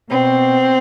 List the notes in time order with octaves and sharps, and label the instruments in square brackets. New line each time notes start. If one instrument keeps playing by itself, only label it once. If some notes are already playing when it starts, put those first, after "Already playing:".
[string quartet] B2 C4